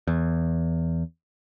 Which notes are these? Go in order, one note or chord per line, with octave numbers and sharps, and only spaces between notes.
E2